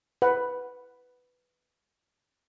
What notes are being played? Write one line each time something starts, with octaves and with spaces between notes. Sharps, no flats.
B4 F#5